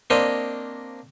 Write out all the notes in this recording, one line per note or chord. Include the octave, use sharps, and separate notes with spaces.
A#3 C4 D4 C5 C#5 D#5